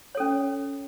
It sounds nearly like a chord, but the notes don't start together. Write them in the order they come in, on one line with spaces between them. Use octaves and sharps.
C#5 A4 C#4